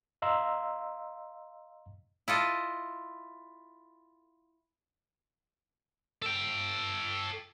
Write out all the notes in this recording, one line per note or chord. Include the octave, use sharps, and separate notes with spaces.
D#5 F5 A#5 C6 E6
E4 F4 A4 D#5
A4 G5